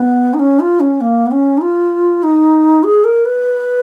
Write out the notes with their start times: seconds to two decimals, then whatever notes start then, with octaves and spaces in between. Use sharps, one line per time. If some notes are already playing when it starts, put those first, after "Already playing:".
Already playing: B3
0.34 D#4
0.39 C#4
0.60 F4
0.80 C#4
1.01 A#3
1.26 B3
1.31 C#4
1.58 D#4
1.61 F4
2.23 D#4
2.84 G#4
3.04 A#4
3.25 B4